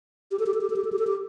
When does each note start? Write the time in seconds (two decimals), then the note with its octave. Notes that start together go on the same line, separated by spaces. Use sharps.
0.31 G4
0.39 A4
0.46 G4
0.54 A4
0.61 G4
0.70 A4
0.76 G4
0.84 A4
0.92 G4
0.99 A4
1.07 G4